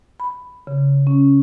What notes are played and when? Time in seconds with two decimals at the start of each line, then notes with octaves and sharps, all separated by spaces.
0.20 B5
0.67 C#3
1.07 C#4